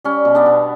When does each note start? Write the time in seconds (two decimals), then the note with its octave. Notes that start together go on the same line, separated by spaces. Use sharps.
0.04 G3 C#4
0.25 B2
0.35 B3 D4
0.46 B2